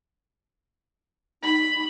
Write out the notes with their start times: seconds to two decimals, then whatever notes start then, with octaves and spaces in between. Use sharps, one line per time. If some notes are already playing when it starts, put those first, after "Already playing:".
1.43 D#4 B5